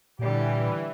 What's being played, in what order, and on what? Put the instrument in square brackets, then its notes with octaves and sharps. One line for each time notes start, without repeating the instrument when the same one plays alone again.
[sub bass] A#2 [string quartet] D3 G3 G4 [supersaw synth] E3